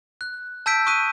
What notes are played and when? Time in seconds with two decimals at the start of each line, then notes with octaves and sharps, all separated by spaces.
0.21 F#6
0.66 A5 E6 G6 B6 D7
0.87 C#6 D#6 F#6 G6 B6 D#7